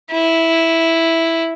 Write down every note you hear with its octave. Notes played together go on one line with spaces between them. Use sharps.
E4